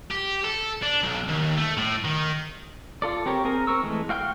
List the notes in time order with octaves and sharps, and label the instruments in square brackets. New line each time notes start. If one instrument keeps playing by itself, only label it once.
[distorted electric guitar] G4
A4
D4
B1
D#2
A3
A2
D#3
[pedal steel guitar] F4 A4 D5
C4 G4 A#4 C#5
C4 G#4 A#4 A#5
C4 A#4 C#6 E6
E3 G#3 A3
F#4 F5 G5 C6 F6